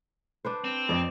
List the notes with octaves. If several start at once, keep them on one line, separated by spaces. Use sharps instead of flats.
D4 B4 C5
C4
F2 D5 D#5